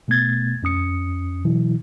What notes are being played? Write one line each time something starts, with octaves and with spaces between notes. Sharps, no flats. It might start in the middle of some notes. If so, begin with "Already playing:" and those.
B2 A3 B3 G#6 A6
F2 C#4 D#6 C#7
B2 E3 F#3 E4